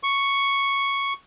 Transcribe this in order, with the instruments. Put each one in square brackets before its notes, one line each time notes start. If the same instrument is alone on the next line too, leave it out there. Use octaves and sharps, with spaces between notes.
[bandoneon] C#6